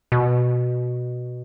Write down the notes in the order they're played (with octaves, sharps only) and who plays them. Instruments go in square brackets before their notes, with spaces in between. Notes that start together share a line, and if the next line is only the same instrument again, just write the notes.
[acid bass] B2